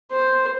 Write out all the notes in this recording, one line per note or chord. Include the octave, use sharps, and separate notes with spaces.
C5